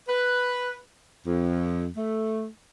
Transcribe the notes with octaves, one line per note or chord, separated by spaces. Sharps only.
B4
F2
A3